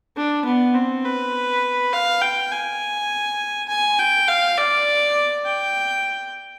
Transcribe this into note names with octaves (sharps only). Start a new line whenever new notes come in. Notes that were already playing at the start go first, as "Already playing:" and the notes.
D4
B3
C4
B4
F5
G5
G#5
G#5
G5
F5
D5
G5